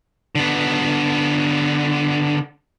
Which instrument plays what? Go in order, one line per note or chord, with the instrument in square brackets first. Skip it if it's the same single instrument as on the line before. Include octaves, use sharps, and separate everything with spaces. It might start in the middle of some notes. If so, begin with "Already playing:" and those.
[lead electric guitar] D3 B3